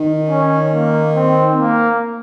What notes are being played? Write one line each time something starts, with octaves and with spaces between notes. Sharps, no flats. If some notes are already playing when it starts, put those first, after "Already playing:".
Already playing: D#3
C#4
A#3
C4
A#3